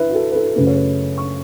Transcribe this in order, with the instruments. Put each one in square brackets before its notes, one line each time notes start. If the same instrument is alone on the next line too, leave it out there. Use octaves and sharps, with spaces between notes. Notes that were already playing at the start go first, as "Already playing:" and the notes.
Already playing: [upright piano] E3 B4 E5
F#4
A4
B4
A4
F#2 C#3 A3 B4
C#5
B4
C#6